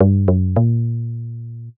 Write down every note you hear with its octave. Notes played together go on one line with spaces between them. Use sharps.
G2
F#2
A#2